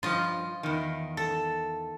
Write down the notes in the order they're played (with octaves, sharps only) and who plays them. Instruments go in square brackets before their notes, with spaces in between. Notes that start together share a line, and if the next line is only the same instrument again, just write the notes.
[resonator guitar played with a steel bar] G2 F3 [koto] F4 D#5
[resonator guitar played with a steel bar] E2 D#3
[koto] A4